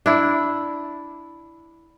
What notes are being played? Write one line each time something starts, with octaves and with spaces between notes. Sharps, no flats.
D4 E4